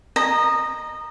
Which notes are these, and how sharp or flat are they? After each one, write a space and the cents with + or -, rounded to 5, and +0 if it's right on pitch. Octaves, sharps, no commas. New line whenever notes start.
D#5 -20 A#5 +0